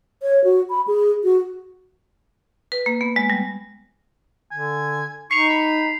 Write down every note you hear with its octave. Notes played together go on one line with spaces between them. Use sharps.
C#5
F#4
B5
G#4
F#4
B4
A#3
B3
G#3
G3
D3 G#5
D#4 C#6 C7 F7
B5